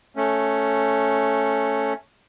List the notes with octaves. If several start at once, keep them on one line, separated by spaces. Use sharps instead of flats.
A3 C#4